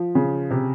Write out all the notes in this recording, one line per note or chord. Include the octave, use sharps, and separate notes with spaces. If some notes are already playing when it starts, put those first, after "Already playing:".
Already playing: F3
C#3
C3